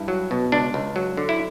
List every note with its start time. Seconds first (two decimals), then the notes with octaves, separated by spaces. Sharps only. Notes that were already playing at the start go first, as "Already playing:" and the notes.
Already playing: G2 E4
0.08 F#3
0.31 B2
0.52 C#2 D4
0.74 C#2
0.96 F#3
1.17 D3
1.29 E4